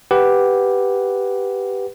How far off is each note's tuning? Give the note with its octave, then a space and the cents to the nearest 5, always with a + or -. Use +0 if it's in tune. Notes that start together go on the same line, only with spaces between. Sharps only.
G4 +0 B4 +0 F#5 +0